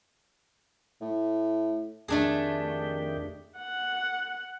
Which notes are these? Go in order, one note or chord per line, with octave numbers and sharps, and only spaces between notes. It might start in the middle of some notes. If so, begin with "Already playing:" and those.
A2
F2 D#3 A3 D4 G4 G#4
F#5